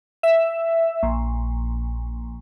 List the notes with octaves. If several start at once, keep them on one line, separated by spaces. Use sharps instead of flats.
E5
A#1